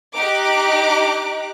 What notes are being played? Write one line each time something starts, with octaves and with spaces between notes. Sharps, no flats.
D#4 G4 D6 F#6